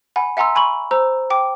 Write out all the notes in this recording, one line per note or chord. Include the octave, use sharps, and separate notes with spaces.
F#5 G#5 B5
E5 F#5 G#5 A#5 C6 E6
G#5 B5 C#6 F#7
C5 A#5 E6
G5 D6